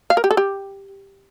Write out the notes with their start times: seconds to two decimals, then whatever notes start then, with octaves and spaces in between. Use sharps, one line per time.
0.10 F5
0.17 A#4
0.24 G4
0.31 A4
0.37 G4